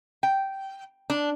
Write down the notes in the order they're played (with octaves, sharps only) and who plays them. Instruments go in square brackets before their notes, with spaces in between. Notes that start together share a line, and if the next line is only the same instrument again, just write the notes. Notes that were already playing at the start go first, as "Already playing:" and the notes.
[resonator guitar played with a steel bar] G5
D4